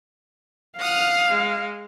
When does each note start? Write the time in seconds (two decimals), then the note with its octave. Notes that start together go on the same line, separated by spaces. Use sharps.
0.78 F5 F#5 D#6 F6
1.29 G#3